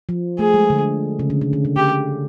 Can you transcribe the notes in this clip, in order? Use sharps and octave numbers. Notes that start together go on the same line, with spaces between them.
F3
A3 G#4
G#3
D3
C#3
D3
C#3
D3
C#3
D3 G4